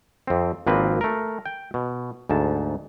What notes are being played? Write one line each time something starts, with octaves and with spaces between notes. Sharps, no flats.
F2 C4
G#1 F3 A#3 C4 B4
A3 A#4
G5
B2
D2 G#2 A5